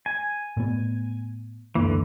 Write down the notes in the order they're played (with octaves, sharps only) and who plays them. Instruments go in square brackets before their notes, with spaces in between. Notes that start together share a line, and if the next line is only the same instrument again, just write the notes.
[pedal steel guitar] G#5
[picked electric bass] A2 B3
[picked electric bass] C#2 F#2 A#3 [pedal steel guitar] D3 E3